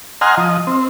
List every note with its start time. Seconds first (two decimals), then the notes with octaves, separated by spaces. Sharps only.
0.21 D#5 F#5 G#5 A#5 C6 F6
0.37 F3 D#5
0.67 C4